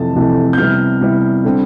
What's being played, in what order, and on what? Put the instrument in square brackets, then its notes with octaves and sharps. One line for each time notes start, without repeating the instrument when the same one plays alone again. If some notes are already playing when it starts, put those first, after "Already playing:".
Already playing: [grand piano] F2 C3 E3 A3 A5
F2 C3 E3 A3
G6
C3 G3 B3 E4 F6
C3 G3 B3 E4
D3 G3 C4